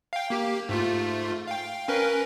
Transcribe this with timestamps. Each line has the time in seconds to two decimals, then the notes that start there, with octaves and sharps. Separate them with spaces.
0.13 F5 G5
0.30 A#3 G4
0.69 G#2 A3 F4
1.47 F5 G5
1.88 C#4 A#4 B4